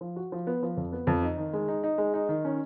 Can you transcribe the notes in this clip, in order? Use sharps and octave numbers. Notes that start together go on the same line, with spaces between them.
F3
F#4
F3
B3
F3
F2
B3
F2
D#4
D#3
G#3
D#4
D#4
G#3
D#4
D#3
C#4